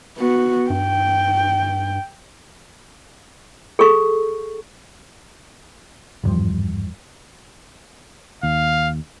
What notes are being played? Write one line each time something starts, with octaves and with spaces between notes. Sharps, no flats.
B3 F#4
G2 G5
G#4 A4 C#6
G#1 E2 G2 F3
D#2 F5